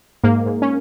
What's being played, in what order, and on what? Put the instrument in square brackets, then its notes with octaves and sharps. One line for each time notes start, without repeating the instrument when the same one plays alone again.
[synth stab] G#2 A#3
G#2
C#4